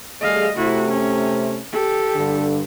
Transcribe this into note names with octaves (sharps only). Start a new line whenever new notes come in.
G3 A3 G#4 D#5 F5
C3 A3 E4 F#4
C#4
G4 A4
G2 D3